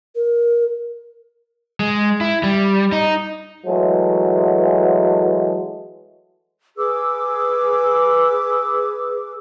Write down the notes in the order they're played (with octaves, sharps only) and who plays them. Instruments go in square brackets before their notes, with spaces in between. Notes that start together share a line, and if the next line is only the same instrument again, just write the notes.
[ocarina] A#4
[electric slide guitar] G#3
E4
G3
D#4
[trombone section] E3 F#3 G#3 A3
[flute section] G#4 B4 D6 E6